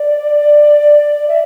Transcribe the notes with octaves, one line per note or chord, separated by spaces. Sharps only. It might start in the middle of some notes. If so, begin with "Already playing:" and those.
Already playing: D5
E5